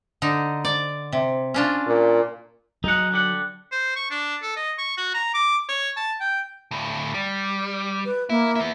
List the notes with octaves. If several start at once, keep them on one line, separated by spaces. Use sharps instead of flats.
D3 D#4
D5
C3
C#4 D4 F4
A#2
F#3 D#4 G#4 F#5
D3 G4 F#5
C5
C#6
D4
A4
D#5
C#6
F#4
A#5
D6
C#5
A5
G5
D2 A2
G3
B4
A#3 E4
B3 E4